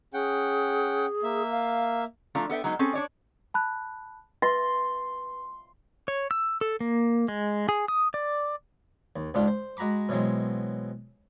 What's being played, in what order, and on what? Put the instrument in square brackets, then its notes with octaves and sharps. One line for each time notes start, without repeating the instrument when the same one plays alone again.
[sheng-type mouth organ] C#4 F#5 G5 [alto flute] G#4
[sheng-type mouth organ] A#3 E5
[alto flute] F5
[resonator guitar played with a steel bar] F3 A3 D4 F4 A4 A#5
B3 A4 E5 G5
F#3 G#3 B3 D#4
C4 C#4 G#4 A4
D4 C#5 D5
[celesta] A5 B5 F#6
[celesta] B4 A6 A#6 [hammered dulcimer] C6
[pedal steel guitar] C#5
E6
A4
A#3
G#3
G#4
D#6
D5
[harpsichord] D#2
C#2 G#2 D4 F4 G4
C5
G#3 F#4 A#5 B5 D6
B2 E3 F#3 G#3 C4